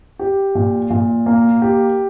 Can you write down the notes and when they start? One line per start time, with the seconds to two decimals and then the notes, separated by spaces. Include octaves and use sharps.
0.19 G4
0.55 A#2
0.90 A#2
1.26 A#3
1.62 G4